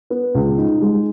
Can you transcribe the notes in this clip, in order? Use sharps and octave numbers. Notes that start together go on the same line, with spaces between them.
B3
C#2
D#4
G#3